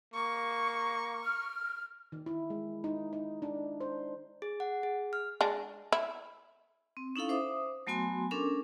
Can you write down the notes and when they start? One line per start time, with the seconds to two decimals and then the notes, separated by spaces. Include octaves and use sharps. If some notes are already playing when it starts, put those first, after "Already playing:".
0.14 A#3 C#6
1.23 F6
2.12 D#3
2.26 E4
2.50 G#3
2.84 D#4
3.13 D#4
3.42 D4
3.81 C5
4.42 G#4
4.60 F#5
4.83 G#4
5.13 F6
5.41 G#3 D4
5.92 E4
6.97 C4
7.16 C#4 D#4 E4 A4 F5
7.29 C5 E5 D6 D#6
7.87 F#3 A3 B3 F#4 G#5 C6
8.31 C#4 D4 A4 A#4 D6